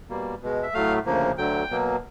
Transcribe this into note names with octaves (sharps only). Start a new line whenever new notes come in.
B2 G3 A#3
B2 G#3
E5
A2 F#3 A3 F5
D2 C#3 F3 A#3
D2 D3 F#3 G5
B2 F#3 A#3